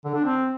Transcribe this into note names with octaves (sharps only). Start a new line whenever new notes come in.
D3
D4
C4